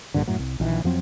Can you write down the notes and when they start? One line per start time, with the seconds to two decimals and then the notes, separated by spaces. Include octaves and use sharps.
0.14 A#1 G2 A#2 D3
0.28 F#2 A2 F#3
0.39 C2
0.60 A#1 D#3 E3
0.84 F2 F3 F#3 C4